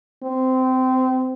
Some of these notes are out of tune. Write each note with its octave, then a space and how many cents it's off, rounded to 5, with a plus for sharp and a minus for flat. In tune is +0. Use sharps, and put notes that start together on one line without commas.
C4 -20